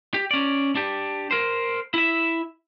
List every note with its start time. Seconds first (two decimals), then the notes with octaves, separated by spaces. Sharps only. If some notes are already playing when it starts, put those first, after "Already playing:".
0.14 G4
0.31 C#4 D5
0.75 D4 G4
1.31 A#4 C5
1.94 E4 E5